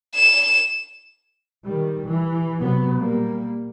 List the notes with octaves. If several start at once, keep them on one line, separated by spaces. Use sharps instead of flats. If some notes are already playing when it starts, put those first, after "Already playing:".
E7
D#3 G3
E3
C3 F#3 B3
A#2 G3 A#3